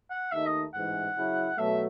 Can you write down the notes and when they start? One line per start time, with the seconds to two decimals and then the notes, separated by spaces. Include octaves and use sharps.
0.11 F#5
0.32 D#2 D#3 A3 D#4 E5
0.46 D#5
0.74 A1 G#2 E3 F#5
1.16 C#3 F#3 C#4 E4
1.58 B2 F#3 A3 E5